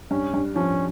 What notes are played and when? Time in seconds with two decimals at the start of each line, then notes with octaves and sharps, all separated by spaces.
0.11 G2 C#4
0.34 G2
0.55 F3 C#4